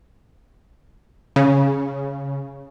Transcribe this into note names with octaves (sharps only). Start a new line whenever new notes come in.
C#3